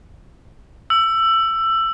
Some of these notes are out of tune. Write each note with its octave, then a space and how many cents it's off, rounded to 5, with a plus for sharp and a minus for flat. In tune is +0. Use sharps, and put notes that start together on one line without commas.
E6 +20